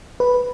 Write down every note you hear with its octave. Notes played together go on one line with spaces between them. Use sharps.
B4